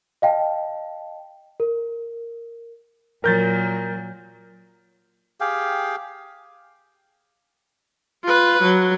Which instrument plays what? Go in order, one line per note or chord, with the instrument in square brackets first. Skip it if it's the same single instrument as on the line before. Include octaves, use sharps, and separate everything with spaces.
[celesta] D#5 F5 G5 A5
A#4
[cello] A#2 F#3 [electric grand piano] A#4 G6 A6
[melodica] G4 G#4 F5 G5
[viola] F4 B4
F#3